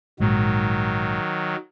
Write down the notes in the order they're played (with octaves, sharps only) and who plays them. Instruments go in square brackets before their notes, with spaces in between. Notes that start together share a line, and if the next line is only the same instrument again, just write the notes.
[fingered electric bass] A#1 G#2 [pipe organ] D#3 F#3